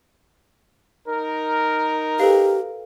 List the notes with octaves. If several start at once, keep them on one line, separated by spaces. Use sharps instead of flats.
D#4 A#4
G4 A4 B4 F5